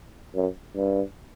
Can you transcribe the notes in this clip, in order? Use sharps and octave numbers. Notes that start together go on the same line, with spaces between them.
F#2
G2